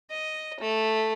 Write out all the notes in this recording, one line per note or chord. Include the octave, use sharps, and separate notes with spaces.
D#5
A3